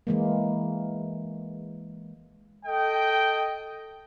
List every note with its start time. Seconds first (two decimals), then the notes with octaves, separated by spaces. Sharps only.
0.07 E3 G#3 A#3
2.66 A4 D#5 G5